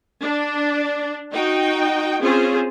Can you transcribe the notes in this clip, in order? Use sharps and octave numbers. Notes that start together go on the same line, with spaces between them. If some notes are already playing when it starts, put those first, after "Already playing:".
D4
D#4 F#4 G5
C4 C#4 F4 G#4 C5